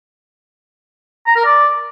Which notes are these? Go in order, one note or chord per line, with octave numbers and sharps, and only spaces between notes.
A#5
A#4
D5